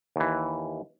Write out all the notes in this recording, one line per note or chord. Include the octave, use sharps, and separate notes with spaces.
D#2 E3